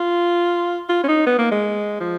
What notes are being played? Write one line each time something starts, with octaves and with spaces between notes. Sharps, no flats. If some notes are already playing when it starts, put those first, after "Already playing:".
Already playing: F4
F4
C#4
D#4
B3
A#3
G#3
F3